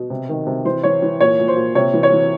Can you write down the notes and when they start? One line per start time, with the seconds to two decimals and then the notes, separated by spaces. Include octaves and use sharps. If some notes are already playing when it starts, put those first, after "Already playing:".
Already playing: B2
0.10 C3
0.29 D#3
0.47 C3
0.65 E3 C5
0.83 E3 C#5
1.02 E3
1.21 A#2 C#5
1.39 A#2
1.48 C5
1.57 A#2
1.75 C3 C#5
1.94 E3
2.03 C#5
2.13 E3